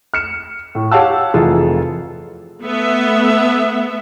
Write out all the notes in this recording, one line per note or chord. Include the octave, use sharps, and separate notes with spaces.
F6 C#7 E7
A2
G4 C#5 F5 F#5 A5 E6
F1 E3 F4 G#4 A4
A3 B3 E5